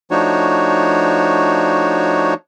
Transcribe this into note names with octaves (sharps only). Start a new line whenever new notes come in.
F3 A3 D4 D#4 F#4 C#5